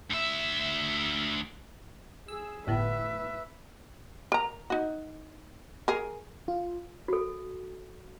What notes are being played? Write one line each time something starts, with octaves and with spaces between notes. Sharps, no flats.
D2 E5
G#4 E6
G1 A2 B3 B4 E5
A#4 A#5
D#4 F#4
G#4 A#4
F4
F#4 A4